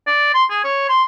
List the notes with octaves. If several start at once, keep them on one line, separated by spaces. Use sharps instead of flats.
D5
C6
G#4
C#5
C6